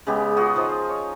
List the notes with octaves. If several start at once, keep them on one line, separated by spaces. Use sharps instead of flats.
C#3 G#3 B3 G4
F4 F#4 G#4 D#5
F3 D#4 C5
C#5